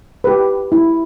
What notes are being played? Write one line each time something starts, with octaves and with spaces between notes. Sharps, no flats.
G4 B4
E4